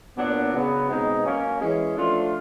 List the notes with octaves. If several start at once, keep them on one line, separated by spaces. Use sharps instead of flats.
A#2 F#3 B3 D4
C#3 F#3 B3
B2 G#3 C4 D#4
F#3 A#3 C#4
E3 G#3 C#4
F3 A3 D4 F4